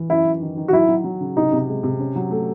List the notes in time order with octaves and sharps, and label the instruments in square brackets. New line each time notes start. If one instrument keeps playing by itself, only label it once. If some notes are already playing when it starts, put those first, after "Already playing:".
Already playing: [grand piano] E3
[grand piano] F#2 [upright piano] E4
[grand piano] F#2
D#3
D#3
[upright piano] F#4
[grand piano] F#3 [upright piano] E4
[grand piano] F#3
F#3
C#3
[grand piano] C3 [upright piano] D#4
[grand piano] C3
G#3
C3
C#4
F#3
A3